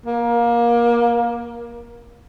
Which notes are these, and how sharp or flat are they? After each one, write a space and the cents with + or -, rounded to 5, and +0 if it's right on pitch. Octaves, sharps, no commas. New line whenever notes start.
A#3 +20